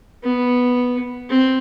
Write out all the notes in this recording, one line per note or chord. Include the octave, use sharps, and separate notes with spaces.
B3
C4